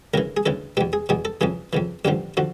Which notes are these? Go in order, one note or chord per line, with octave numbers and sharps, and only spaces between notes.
D2 C#3 E3 A#4
G#4
D2 C#3 E3 A4
E2 B2 G4
G#4
E2 B2 G#4
A4
F2 C#3 E3 G#4
F2 C#3 E3
A1 G2 D3 F3 G4
D3 F3 F#4